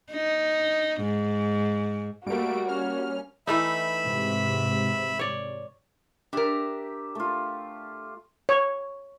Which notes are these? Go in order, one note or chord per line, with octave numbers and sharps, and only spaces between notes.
D#4
G#2
G3 A3 A#3 F#4 D7
C#4 F6
E3 A3 D#4 E5 B5
G#2 C3
C#5 D5
D4 G4 A#4 E5
A3 F4
C#5